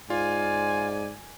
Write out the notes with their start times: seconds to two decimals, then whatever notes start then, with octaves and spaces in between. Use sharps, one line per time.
0.10 G#2 F4 D5 G#5